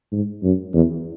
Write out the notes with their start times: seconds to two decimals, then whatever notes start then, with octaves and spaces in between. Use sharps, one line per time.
0.12 G#2
0.43 F#2
0.74 E2